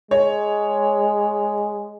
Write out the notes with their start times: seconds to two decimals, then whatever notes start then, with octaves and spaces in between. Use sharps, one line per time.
0.11 G#3 C#5